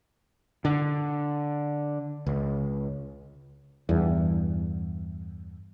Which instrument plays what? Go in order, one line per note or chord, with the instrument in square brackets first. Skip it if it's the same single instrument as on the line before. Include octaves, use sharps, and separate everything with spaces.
[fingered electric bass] D3
C#2
[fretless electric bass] E2 G2